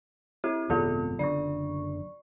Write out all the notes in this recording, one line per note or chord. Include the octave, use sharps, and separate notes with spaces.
C4 E4 G4
G#1 F#2 C3 B3 F4 A4
F#1 F#2 D3 D5 C#6